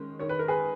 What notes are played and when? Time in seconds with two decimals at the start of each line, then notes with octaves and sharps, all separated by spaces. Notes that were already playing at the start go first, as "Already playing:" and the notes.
Already playing: D#3 G#3 C#4
0.20 D#3 C#5
0.29 B4
0.39 A#4
0.48 G#4 B4